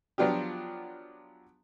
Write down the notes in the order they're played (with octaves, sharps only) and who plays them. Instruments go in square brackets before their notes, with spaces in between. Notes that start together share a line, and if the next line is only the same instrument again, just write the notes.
[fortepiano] F3 F#3 B3 D4 F4 G4